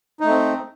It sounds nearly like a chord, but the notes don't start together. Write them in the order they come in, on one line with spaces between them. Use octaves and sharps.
D#4 A3 C4